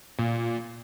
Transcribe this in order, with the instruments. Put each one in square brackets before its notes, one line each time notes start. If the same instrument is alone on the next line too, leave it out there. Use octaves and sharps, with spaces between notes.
[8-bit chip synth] A#2